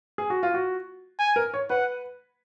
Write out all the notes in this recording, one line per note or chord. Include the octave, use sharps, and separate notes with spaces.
G#4
F#4
F4
F#4
G#5
A#4
C#5
B4 F#5